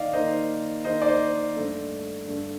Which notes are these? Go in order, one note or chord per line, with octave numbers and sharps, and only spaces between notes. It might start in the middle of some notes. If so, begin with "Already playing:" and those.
Already playing: D#3 A#3 D#4 D5 D#5 F5
D#3 A#3 D#4 C5 D#5
D#3 A#3 D#4 C5 D#5
D5
C5 D#5
G2 D3 A3 D4
G2 D3 A3 D4